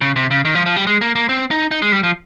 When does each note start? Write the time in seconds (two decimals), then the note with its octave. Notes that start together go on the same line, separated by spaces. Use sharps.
0.01 C#3
0.16 C3
0.31 C#3
0.45 D#3
0.55 F3
0.66 F3
0.76 G3
0.87 G#3
1.01 A#3
1.15 A#3
1.29 C4
1.51 D#4
1.71 D#4
1.82 G#3
1.92 G3
2.03 F3